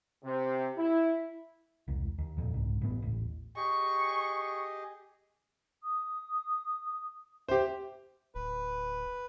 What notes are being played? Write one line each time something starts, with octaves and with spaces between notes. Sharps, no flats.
C3
E4
E1 C2
D#2
F2 A#2
C2 G#2
A1 G2 B3
D#1 A1
G4 G#4 D#5 C#6
D#6
G4 C5 E5
D1 B4